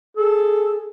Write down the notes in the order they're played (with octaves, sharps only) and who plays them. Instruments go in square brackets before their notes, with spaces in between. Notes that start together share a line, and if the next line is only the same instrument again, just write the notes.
[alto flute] G#4 [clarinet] A4